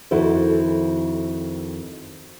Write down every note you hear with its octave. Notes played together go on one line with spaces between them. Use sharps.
F2 D#3 E4 F#4 A4 C5